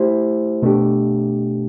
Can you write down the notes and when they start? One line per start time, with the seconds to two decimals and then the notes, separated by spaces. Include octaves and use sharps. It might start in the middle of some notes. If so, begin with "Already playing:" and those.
Already playing: A3 E4 G4 C5
0.62 B2 A3 D4 G4